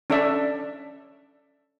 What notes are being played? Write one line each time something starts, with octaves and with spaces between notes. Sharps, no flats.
C#4 D4 A4 D5 E5